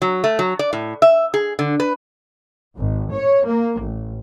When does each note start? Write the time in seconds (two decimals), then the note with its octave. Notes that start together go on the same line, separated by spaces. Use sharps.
0.02 F#3
0.24 A3
0.39 F#3
0.59 D5
0.73 A2
1.02 E5
1.34 G#4
1.59 D3
1.80 B4
2.77 G#1
3.11 C#5
3.46 A#3
3.79 A1